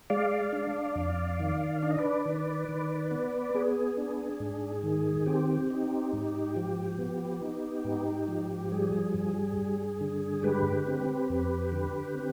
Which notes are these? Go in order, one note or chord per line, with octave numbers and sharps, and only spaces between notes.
G#3 D5 F5
D4
F2
D#3
D4 D5
D#5
B4 D5
D#3
D#3
B3
B3 G#4
D4
G#2
D#3
C4 G4
D#4
G#2
F3
B3
D#4
G#2
F3
G3 G#4
G2
G2
D3
G#3 G4 B4
C4
F2
D3
C4